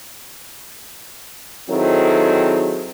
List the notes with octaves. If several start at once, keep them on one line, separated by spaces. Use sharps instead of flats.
D#3 F#3 C4 E4 G#4 A4